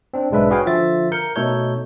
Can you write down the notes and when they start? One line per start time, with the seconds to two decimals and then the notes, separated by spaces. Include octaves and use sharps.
0.14 C4 D4
0.31 B1 G#2 G#3 D4 B4 E5
0.50 F#4 G#4 B4 C#5 F5 G5
0.66 D3 F3 F4 E5 A6
1.12 A#4 G6 C#7
1.36 B2 A3 D#4 A4 C#5 G6